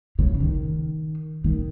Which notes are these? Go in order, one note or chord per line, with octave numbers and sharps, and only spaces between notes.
C#3
D#3
D#3